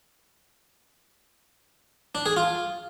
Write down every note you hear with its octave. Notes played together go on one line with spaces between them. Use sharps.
D4
G#4
F4